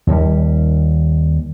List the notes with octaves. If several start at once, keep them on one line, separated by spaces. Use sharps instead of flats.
D#2 G3